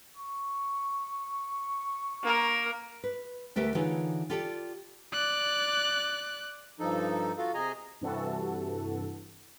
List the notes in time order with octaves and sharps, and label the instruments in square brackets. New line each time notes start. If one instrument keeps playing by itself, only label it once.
[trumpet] C#6
[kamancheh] A#3 A#4
[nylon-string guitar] B4
D2 A3 G4 A#4 B4 E5
D3 E3 D#4 F4 G#4 C#5
F4 G4 A4 D5 E5 G5
[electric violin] D5 F#6
[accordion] G2 F3 D#4 A4
F4 F#4 A4 F5
C3 G#4 D#5 G#5 A#5
[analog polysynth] G2 C3 E3 F#4 A4